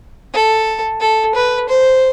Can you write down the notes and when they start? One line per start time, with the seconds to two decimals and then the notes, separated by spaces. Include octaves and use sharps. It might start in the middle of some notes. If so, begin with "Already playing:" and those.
0.34 A4
1.01 A4
1.35 B4
1.69 C5